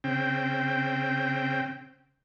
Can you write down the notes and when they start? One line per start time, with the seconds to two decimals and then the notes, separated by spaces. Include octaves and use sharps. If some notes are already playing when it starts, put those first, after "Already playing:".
0.04 C#3 C4 G5